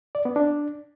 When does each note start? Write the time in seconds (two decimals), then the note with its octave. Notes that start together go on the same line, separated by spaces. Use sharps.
0.15 D5
0.25 B3
0.36 D4